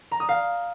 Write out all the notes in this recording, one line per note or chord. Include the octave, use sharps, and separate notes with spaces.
A#5
D#6
F5